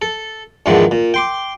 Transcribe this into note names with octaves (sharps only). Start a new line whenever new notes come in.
A4
E2 G#2 D3 D#3 F3
A#2
G5 C6 D6